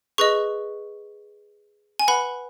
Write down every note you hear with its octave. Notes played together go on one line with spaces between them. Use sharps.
G#4 B4 D#5 C#6
G#5
B4 F#5 B5